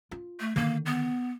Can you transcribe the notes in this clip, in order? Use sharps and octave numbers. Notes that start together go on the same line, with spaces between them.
F4
A3
D3 D#3 A#3
B3